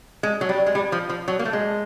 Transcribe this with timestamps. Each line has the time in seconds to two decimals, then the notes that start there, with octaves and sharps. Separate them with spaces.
0.23 G#3
0.41 F#3
0.49 G3
0.66 G#3
0.75 G3
0.92 F3
1.09 F3
1.28 F#3
1.39 A#3
1.45 A3
1.53 G#3